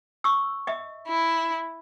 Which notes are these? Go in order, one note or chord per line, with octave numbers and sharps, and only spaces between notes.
C#6 E6
D#5 E5
E4